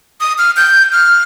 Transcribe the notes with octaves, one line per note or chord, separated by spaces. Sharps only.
D#6
F6
G6
F6